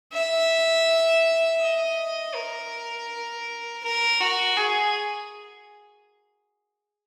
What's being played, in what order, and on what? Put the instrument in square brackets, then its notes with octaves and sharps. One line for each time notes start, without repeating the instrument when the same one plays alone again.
[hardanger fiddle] E5
D#5
A#4
A#4
F#4
G#4